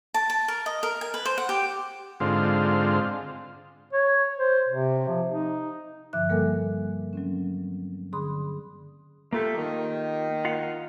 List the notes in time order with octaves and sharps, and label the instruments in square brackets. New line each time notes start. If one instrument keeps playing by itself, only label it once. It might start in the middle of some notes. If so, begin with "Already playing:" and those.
[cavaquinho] A5
A5
A#4
D#5
A#4
G#5
B4
C5
F#5
G4
[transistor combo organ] G#2 D3 C4 F4
[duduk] C#5
C5
C3
F3
D#4
[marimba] G2 D3 F3 E5 D6 F#6
G3 A#3 A4 A#4 F#5 G#5
F#3 C4 C#4
D3 G#4 B5 C6 D#6
[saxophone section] A3 [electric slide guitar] A#3 F4 G4
[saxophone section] D#3
[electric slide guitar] F4 F5 F#5